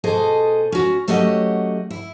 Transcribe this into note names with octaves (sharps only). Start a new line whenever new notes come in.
B2 G#4 A4 C5 D#5
C#4 F#4
F#3 A3 C#4 G4 D#5 F#5
E4